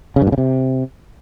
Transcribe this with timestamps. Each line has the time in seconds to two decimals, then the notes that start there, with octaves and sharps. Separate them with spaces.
0.16 C#3
0.22 G2
0.27 A#2
0.32 C#3
0.38 C3